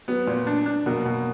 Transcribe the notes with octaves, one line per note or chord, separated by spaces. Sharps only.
F#3 B3
A#2
D4
D4
B2 F#3 A#3
B2